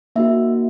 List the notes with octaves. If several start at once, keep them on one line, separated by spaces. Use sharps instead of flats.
A#3 D#4 F#4 E5